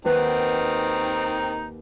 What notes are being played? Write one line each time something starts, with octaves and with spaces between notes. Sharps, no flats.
D#2 D#3 C4 D#4 B4 F#5